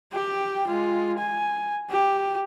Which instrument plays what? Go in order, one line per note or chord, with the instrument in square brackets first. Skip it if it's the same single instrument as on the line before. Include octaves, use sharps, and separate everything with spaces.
[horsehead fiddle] G4 G5
G#3 F4
G#5
G4